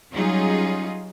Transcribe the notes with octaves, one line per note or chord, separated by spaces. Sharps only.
F#3 G3 C#4 D#4 F4 G#4